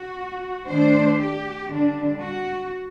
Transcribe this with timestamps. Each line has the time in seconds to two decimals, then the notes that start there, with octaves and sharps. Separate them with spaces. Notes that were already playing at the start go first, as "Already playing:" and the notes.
Already playing: F#4
0.68 D#3 A3 D4 C5
1.20 G4
1.71 D3 G3 D4
2.22 F#4